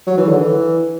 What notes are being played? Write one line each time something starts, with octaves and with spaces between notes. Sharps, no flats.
F#3
E3
D3
E3